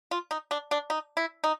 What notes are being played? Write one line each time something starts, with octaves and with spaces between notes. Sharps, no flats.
F4
D#4
D4
D4
D#4
E4
D#4